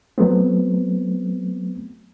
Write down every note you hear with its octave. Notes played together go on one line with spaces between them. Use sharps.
F#3 A3 B3 C4